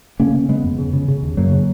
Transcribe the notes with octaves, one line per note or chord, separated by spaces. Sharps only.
C#3 A#3 C#4
C#3
C#3 G#3 B3
F2
C#3
C#3
C#3
D#2
F#2 F#3 A#3
C#3